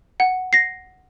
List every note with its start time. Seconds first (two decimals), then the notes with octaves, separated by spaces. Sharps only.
0.20 F#5
0.53 A#6 C7